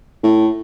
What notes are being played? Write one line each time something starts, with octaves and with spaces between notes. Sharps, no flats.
A2